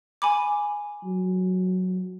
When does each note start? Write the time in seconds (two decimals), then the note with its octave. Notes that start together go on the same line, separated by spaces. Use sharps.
0.22 G#5 B5 D6
1.04 F#3